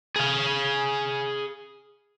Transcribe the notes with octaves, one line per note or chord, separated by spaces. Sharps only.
G#4 F5